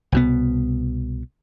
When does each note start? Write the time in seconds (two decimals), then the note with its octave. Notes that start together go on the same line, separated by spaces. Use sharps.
0.12 C2 B2 B3